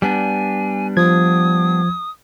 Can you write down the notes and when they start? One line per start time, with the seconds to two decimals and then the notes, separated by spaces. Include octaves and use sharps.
0.02 G3 B3 D4 G#5
0.97 F3 D#6 G#6